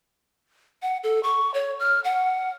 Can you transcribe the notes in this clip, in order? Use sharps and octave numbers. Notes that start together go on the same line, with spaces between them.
F#5
A4
C#6
C#5
F6
F#5